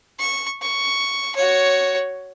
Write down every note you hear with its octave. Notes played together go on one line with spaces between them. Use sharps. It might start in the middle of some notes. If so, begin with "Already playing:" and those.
C#6
C#6
F#4 C#5